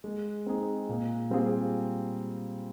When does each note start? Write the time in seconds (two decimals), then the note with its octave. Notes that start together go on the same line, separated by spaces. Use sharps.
0.04 G#3
0.46 C4 D#4 G#4
0.89 A#2
1.30 G3 C4 F4 G#4